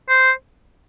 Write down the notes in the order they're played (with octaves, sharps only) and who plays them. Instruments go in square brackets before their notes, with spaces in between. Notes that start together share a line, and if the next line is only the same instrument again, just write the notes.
[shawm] C5